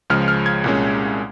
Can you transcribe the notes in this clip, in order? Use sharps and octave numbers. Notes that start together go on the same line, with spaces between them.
C#2 C#3 F3 G#3 F6
F6
G#6
C2 A#2 G#3 C#4